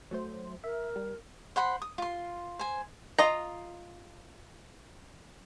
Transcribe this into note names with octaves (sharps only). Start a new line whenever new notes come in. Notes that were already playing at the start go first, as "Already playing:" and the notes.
F#3 A3 C5
A#4 E5
G3
C5 F#5 B5 C6
D#6
F4 C6
C5 G#5
F4 D#5 A#5